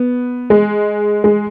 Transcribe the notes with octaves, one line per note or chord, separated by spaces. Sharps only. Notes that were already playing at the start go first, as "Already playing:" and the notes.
Already playing: B3
G#3
G#3